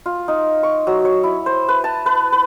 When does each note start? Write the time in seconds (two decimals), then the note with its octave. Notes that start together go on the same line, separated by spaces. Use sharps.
0.06 F4
0.28 D#4
0.63 C#6
0.87 F#3
1.05 C#5
1.23 E4
1.46 C5
1.68 B4
1.84 A5
2.06 B4
2.32 B4